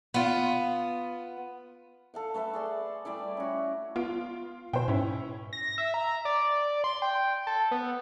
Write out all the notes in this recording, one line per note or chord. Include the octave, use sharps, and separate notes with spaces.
B3 F4
A4 F5 F#5
A3 A4 B4 E5
G#4 D5 C6
G3 A3 E4 D5
C#4 F#4
B3 F4 D7
B2 C5 G5
G#2 C#4 E4
A#6
E5
A#5
D5
C6
G5
A4
B3